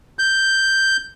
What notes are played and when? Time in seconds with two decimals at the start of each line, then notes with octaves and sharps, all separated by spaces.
0.19 G6